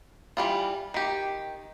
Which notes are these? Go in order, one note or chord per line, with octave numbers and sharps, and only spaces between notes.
E3 F#3 G3 F4
D#3 G4